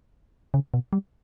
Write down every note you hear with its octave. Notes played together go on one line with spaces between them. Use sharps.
C#3
B2
G3